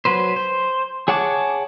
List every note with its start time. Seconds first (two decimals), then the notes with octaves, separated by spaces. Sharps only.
0.05 F#3 B4 C5
0.36 C5
1.08 G#4 C#5 F#5 A5 D6